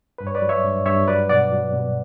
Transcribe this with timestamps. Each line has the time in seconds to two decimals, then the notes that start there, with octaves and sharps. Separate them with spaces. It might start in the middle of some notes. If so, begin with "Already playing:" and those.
0.18 G2 B4
0.27 C#5
0.35 B4 D5
0.42 F#3
0.49 C#5 E5
0.64 G2
0.86 G2 C#5 E5
1.08 F#3 B4 D5
1.29 B2 D5 F#5
1.52 F#3
1.73 B2